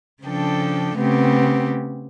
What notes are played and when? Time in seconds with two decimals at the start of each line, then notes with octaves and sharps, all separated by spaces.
0.22 C#3 F3 D4 A4 G5
0.96 C#3 A3 B3 C4 G4